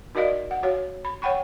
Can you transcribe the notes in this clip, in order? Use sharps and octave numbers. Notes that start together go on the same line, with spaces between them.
D#4 F#4 A#4 D5 D#5 F5
F#5
F#4 C#5 F5
B5
C#5 F#5 G5 B5 C#6